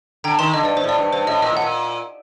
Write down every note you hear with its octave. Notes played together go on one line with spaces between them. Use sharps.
D3 G5 A#5
D#3 A5 C6
D3 D#5
G2 D5
G2 C5
A2
D5
G2
G2 C5
A2 D#5
A#2 D#5
A2
F#5
A#2